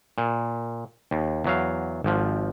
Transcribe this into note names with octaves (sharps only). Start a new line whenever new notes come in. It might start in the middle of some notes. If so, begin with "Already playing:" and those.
A#2
D#2
E2 F#3 F5
G#1 F3